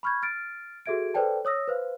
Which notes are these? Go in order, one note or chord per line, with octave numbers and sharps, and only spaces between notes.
B5 C#6 F6 G6 G#6
F6 A6 D7
F#4 G#4 A4 E5 G#6 D7
A4 B4 C5 D5 G5 A5
C#5 D#6 E6 A#6
B4 C5 F5